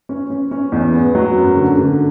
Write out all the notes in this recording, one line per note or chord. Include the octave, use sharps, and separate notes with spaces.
C#4
C#4
C#4
E2
B3
F#3
F#2
D3
D3